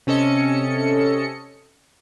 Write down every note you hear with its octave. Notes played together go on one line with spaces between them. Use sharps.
C3 C#4 A4 D#5 C#7